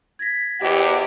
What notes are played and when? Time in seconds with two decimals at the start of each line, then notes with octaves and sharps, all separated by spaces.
0.19 G#6 A#6 B6
0.62 E2 G4 C5 D#5